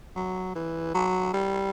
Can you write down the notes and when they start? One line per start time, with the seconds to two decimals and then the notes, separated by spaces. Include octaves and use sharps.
0.16 F#3
0.55 E3
0.94 F#3
1.34 G3